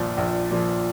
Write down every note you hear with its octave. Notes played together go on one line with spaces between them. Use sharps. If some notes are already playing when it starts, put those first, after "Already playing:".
Already playing: A#1 A#2 F3
A#1
A#2 F3